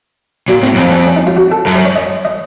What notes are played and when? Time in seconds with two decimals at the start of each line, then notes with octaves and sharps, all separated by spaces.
0.48 A#2 F#3
0.63 A2 C4
0.74 F#2
0.78 F2 C4
0.92 C#4
1.07 C#4
1.16 D#4
1.27 F4
1.37 F#4
1.52 A4
1.66 F#2 A#4
1.76 C5
1.85 C#5
1.96 D#5
2.25 D#5